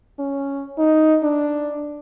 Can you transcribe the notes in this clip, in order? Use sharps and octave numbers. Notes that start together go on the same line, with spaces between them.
C#4
D#4
D4